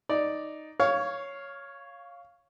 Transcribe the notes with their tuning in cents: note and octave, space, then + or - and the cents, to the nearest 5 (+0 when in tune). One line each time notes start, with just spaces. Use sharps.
D#4 +0 D5 +0
C#5 +0 F5 +0 C#6 +25